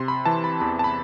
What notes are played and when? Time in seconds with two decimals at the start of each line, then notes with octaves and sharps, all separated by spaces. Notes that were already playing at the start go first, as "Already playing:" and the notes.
Already playing: C3 C6
0.08 B5
0.25 E3 A5
0.44 B5
0.60 E2 B5
0.79 A5
0.84 B5